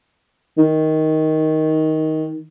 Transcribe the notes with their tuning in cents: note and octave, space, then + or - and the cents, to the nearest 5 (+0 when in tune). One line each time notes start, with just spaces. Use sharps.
D#3 +10